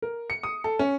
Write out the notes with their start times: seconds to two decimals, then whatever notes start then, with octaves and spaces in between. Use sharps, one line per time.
0.02 A#4
0.30 C#7
0.43 D#6
0.64 A4
0.79 C#4